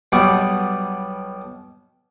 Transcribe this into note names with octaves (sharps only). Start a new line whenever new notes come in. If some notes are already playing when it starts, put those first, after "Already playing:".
B1 B2 G3 B3 D5 C#6